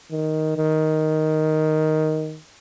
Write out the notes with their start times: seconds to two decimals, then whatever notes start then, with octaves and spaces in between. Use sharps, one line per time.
0.12 D#3
0.57 D#3